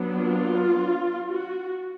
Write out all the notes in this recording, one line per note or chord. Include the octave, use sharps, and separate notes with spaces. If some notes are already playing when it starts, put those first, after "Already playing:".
Already playing: F#3 B3 D4
F4
F#4